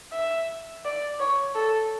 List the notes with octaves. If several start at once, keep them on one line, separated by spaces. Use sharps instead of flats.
E5
D5
C#5
A4